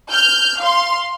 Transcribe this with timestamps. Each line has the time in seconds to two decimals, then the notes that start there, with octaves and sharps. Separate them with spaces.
0.11 F6 G6
0.59 F5 C6